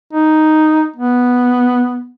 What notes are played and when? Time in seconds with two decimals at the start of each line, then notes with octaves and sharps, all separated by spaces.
0.13 D#4
0.96 B3